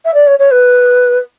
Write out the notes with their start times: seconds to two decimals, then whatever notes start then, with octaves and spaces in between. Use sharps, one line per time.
0.05 E5
0.14 D5
0.27 C#5
0.39 C#5
0.51 B4